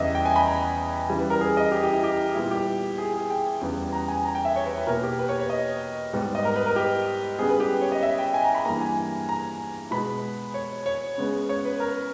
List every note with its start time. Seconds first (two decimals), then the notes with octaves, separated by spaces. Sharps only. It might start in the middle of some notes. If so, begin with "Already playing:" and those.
Already playing: E2 C#3 G3 B3 D#5 E5
0.15 G5
0.26 G#5
0.36 B5
0.46 A#5
1.09 C#3 E3 G3
1.19 B4
1.30 A#4
1.41 G#4
1.57 D#5
1.72 G4
1.83 G4
1.93 E4
2.03 G4
2.35 A#2 G3 B3 E4
2.51 G4
2.98 G#4
3.14 G#4
3.30 G5
3.61 E2 C#3 G3 B3
3.92 A#5
4.08 G#5
4.25 A#5
4.35 G5
4.45 E5
4.56 C#5
4.66 B4
4.77 B4
4.87 B2 A#3 A#4
5.03 G4
5.19 B4
5.29 C#5
5.40 C#5
5.50 D#5
6.13 G#2 G3 B3
6.35 D#5
6.45 A#4
6.56 B4
6.66 A#4
6.76 G4
7.39 C#3 G3 B3 G#4
7.49 B4
7.60 G4
7.81 C#5
7.92 D#5
8.03 E5
8.19 G5
8.34 G#5
8.44 A#5
8.55 B5
8.65 G2 E3 A#3 A#5
8.81 G#5
9.29 A#5
9.91 B2 G#3 B3 B5
10.54 C#5
10.86 C#5
11.18 C#3 G#3 B3
11.49 C#5
11.65 B4
11.80 A#4